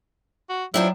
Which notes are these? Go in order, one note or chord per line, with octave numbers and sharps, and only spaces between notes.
F#4
F3 F#3 D4 E4 G4